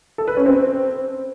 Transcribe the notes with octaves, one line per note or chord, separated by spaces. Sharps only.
A4
B4
C#4
C4